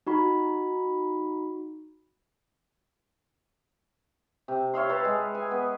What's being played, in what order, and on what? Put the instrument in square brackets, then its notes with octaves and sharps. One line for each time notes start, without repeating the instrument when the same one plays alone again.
[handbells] D#4 F#4 B5
[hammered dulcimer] C3
C#5 E5 F5 C6
B4 A5
G#3
G#5
B3